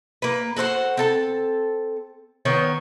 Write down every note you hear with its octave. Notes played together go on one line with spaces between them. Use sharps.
A#3 B4
F#4 A4 C5 F#5
C4 A4 A5
D#3 B3 C#5